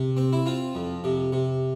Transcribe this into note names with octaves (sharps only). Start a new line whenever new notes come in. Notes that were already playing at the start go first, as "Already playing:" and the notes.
Already playing: C3
C4
E4
C4 F4
F2
C3
C3